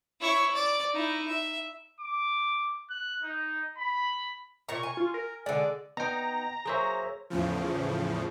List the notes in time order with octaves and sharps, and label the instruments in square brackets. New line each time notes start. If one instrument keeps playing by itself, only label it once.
[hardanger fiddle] E4 C#5
D5
D#4 E4
E5
[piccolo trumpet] D6
F#6
D#4
B5
[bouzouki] A#2 A#5 [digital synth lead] C#6
[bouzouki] G#5
[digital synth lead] F4
A#4
[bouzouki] D3 G#3 [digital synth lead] D5
[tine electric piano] B3 G5 [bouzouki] D#4 [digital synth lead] A#5
[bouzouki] F#3 A#3 C#5 [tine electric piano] G#4 C5 E5
[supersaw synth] E2 A2 C#3 F3